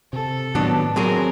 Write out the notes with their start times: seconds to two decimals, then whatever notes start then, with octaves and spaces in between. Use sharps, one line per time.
0.13 C3 A4
0.55 A2 D#3 F#3 B3 D4
0.96 F#3 C4 G#4 A#4